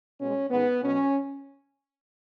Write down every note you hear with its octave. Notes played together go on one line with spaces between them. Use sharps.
B2 G#3 C#4
G#2 D#3 G#3 B3
B2 F#3 C#4